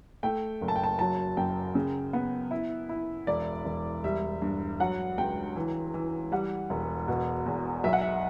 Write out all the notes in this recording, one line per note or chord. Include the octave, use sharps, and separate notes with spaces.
A3 G5
F#1
A5
G5
A5
F#3 A5
F#2 G5
C#3
B3
E4
E4
E1 D5
E1
G3 E5
G2
F#3 F#5
C#2 G5
E3
E3
G3 F#5
E1
B2
E2
B1 E5
F#5
E5